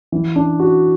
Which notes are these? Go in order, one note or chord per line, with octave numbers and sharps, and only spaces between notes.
E3
D4
F#4